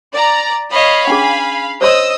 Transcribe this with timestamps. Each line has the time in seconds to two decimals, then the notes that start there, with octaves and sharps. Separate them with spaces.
0.13 D5 A#5
0.72 C#5 D#5 F5 B5
1.07 C#4 D4 G#4 G#5
1.81 C5 C#5 D#5 C6 D#6 E6